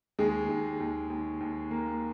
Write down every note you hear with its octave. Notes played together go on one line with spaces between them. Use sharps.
D#2 G#3 G#4
D#2
D#2
D#2
D#2
A#3